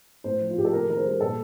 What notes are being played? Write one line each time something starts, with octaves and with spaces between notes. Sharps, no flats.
A2 C5
F3
F4
A2 G4
A4
C3 A#4
D#3 A#4
C5
G3 A#4
A#2 A4